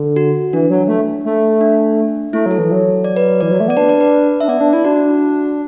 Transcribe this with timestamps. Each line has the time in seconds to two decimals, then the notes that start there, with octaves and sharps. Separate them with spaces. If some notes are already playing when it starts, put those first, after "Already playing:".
Already playing: D3
0.16 F#4
0.53 E3 D4
0.70 F#3
0.88 A3
1.25 A3
1.61 D4
2.33 A3 E4
2.46 F#3 A4
2.59 E3
2.71 F#3
3.04 D5
3.16 B4
3.41 E3 D5
3.51 F#3
3.60 A3
3.68 B3 D5
3.77 D4 B4
3.89 D5
4.01 B4
4.40 D4 E5
4.48 B3 D5
4.61 D4
4.73 E4 D5
4.85 D4 F#4